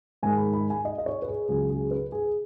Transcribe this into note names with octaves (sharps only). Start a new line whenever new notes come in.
G#2 D#3 G#3 G#5
B5
B5
G#5
D#5
D#5
C#5
B4
G#4
C#2 C#3 F#3 G#4
G#4
B4
G#4